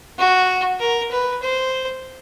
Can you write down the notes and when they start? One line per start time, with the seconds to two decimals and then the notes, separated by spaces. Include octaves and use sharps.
0.19 F#4
0.80 A#4
1.11 B4
1.42 C5